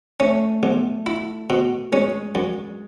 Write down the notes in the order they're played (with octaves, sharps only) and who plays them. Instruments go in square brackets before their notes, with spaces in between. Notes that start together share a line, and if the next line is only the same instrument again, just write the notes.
[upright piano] A3 [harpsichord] C#4
[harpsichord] B1
E4
B2
[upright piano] G#3 [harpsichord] C#4
[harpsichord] F#2